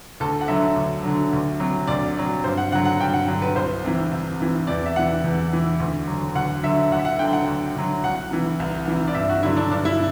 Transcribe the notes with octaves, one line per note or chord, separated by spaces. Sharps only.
D2 A4
F#5
D3 F#3 E5
D2
D3 F#3
D2
C3 F#3
D2 D5
C3 F#3
G2 C5
F#5
D3 F#3 F#5
F#5
G2 G5
F#5
D3 F#3
B4
C2 C5
C3 E3
C2
C3 E3
E2 D5
E5
C3 E3 F#5
E2
C3 E3
D2
D3 F#3
D2 F#5
D3 F#3 E5
D2 F#5
E5
F#5
D3 F#3 G5
F#5
D2
D3 F#3
C2 F#5
C3 E3
C2
C3 E3
D5
G2 E5
F#4
D3 F#3 E4
D4
G2 D4
E4